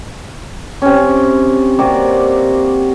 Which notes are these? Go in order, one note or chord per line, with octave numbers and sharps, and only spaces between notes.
C3 C#4
C3 A#3 F#4 D5